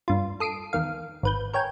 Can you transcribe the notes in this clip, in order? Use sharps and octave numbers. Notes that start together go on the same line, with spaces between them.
G2 F4
A4 D#6 C7 D7
E2 D#3 F5
G#1 B4 G6
A#4 C#5 G5 G#5